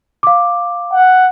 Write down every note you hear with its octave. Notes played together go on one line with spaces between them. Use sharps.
F5 D6
F#5